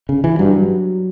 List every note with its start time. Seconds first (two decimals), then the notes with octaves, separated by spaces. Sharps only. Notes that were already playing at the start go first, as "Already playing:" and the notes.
0.09 C#3
0.24 E3
0.39 G2 F#3